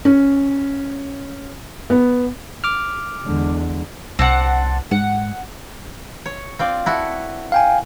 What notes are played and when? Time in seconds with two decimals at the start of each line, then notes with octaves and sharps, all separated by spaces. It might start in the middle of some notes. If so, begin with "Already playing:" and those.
0.05 C#4
1.90 B3
2.64 D6 F6
3.25 E2 D3 G#3
4.19 C2 C4 D4 F#5
4.91 G#2 F#5
6.26 C#5
6.59 C4 F4 D5
6.86 E4 F#4 A4
7.52 F5 G5 G#5